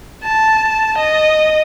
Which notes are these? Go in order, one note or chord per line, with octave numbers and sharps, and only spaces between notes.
A5
D#5